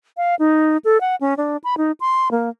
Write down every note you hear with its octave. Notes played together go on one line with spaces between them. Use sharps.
F5
D#4
A4
F#5
C#4
D4
B5
D#4
C6
A#3